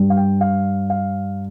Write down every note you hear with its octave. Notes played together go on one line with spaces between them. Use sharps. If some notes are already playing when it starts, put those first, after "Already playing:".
Already playing: G2 G3
F5
G5
F5
F5